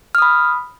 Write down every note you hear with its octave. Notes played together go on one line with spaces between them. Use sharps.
B5 D#6 F6